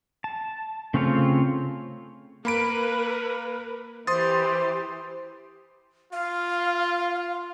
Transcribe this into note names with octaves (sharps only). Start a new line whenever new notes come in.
A5
C#3 A3 C4 F4 C#5
A#3 A#4 B4 B5 D7
E3 G4 C5 C6 D#6 A6
F4 F5